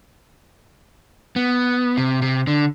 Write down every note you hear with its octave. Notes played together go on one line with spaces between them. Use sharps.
B3
C3
C3
D3